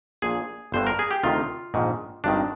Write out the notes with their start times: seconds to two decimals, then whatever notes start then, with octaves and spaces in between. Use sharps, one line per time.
0.22 A#1 A#2 G#4
0.72 G1 G2 D3 C5
0.87 A#4
0.99 G#4
1.11 G4
1.23 D2 C3 D#3 F4
1.74 A#1 G#2 D#3
2.24 G#1 G2 D#3 D4